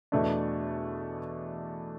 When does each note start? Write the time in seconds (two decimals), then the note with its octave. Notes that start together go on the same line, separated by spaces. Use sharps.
0.12 E2 B2 A3 D4